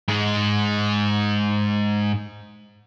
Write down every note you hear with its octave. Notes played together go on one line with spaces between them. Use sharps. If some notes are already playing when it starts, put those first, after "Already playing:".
G#2 G#3